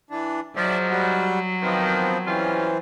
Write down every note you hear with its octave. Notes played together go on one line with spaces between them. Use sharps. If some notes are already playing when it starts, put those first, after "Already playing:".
E3 D4
G#2 F3 F#3 D5 E5
G3 F#4
D#3 F3 B3 C4
E3 G3 C4 C#4 F4